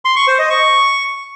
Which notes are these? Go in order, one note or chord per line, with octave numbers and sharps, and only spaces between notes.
C6
C#6
C5
D#5
C#6